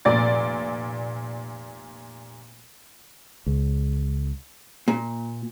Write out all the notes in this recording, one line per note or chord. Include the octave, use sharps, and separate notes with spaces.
F1 A#2 D5 A6
C#2
A#2